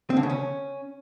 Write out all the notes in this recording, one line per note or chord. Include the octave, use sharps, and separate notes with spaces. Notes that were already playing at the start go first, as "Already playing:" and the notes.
C4
D3
C#3
C#4